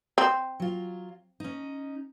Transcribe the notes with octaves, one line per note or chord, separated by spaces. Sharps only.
C4
F#3 F4
C#4 D#4